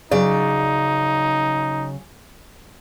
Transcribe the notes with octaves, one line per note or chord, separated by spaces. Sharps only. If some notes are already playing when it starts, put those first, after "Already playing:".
C#3 F#3 D#4 D5